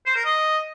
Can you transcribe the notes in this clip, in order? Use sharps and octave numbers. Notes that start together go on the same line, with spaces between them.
C5
A#4
D#5